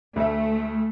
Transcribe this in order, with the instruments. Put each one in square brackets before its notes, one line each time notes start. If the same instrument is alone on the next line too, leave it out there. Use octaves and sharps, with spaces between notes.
[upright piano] D2 E5 [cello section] A3